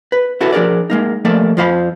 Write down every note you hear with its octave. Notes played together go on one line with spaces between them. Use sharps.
B4
E4 F#4 A4 B4
F3 D4 G#4 A#4 D5
G#3 A#3 D#4
F3 A3 A#3 A4 D5
F2 F3 F4 C5 F5 B5